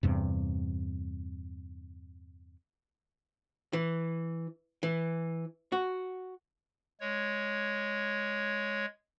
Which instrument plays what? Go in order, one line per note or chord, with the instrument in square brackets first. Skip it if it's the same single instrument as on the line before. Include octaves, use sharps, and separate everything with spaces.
[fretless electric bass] E2 G2 C3
[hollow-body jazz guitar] E3
E3
F#4
[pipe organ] G#3 C#5